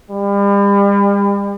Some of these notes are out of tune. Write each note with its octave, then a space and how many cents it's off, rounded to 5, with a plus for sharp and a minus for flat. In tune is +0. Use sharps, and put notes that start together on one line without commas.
G3 +40